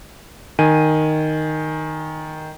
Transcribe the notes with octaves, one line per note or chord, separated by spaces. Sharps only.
D#3 G#5 D#7